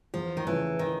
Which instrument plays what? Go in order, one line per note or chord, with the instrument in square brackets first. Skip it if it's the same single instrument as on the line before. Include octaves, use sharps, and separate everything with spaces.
[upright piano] E2 [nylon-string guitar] F3
[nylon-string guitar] D#3
[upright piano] C#3 F3 A3 C#4 [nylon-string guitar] E3
[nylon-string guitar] D#3